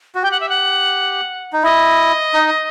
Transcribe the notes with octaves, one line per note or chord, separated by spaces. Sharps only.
F#4
G4 G5
F#5
E5
F#5
D#4
E4 D#5
D#4